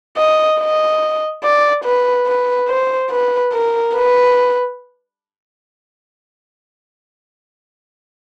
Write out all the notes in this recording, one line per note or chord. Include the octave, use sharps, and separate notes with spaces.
D#5
D#5
D5
B4
B4
C5
B4
A#4
B4